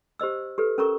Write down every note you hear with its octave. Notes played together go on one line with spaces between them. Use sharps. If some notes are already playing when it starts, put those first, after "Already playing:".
G4 C5 D#5 E6
G4 A4 B4
C#4 A4 A#4 A#5 C#6